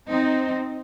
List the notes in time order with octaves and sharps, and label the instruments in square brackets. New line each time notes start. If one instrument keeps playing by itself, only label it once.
[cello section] C4 D#4